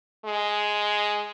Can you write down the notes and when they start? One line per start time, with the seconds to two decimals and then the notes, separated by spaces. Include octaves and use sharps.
0.25 G#3